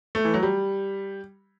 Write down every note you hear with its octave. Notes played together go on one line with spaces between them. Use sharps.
A3
E3
F#3
G3